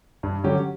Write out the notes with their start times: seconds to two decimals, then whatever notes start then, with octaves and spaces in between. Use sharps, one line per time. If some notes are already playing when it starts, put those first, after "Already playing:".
0.23 G2
0.44 D3 F#3 C#4 G4